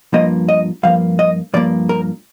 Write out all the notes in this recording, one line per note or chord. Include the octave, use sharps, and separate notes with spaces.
G2 F3 A#3 D#5
D#5
G2 F3 A#3 F5
D#5
G2 F3 A#3 D5
A#4